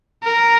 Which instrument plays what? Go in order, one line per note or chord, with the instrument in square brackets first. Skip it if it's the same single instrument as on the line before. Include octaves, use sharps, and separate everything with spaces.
[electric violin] A#4